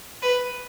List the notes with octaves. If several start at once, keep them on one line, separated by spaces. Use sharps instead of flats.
B4